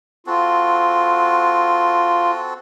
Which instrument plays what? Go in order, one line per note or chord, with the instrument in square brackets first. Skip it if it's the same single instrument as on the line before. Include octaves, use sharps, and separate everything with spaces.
[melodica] C4 F#4 A4 [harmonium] F4